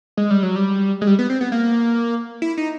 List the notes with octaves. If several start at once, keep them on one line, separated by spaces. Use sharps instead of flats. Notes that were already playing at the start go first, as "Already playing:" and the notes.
G#3
G3
F#3
G3
G#3
G3
B3
C4
B3
A#3
E4
D#4